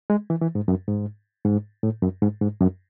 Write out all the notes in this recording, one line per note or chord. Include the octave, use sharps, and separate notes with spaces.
G#3
E3
E3
G#2
F#2
G#2
G#2
A2
F#2
G#2
G#2
F#2